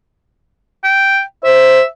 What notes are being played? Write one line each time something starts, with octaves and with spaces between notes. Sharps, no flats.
G5
C5 E5